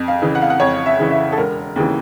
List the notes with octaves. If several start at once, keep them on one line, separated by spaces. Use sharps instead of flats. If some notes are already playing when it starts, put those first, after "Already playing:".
Already playing: F2
F5
C#3 E3
F#5
F5
F#5
F2 C#5
E5
C#3 E3
E5
A4
E1 A#4
D#2 C#3 E3